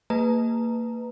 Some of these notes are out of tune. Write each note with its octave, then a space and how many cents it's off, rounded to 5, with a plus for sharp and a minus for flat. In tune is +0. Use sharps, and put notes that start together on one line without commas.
A#3 -25 B4 +5 A#5 -5